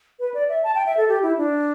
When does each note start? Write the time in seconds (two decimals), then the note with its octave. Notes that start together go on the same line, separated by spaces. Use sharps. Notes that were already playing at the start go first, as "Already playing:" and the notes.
0.19 B4
0.34 D5
0.49 E5
0.64 A5
0.75 G5
0.86 E5
0.97 A4
1.08 G4
1.23 E4
1.38 D4